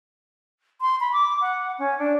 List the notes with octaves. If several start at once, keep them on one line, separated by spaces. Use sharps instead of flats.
C6
B5
D6
F#5
C#4
D4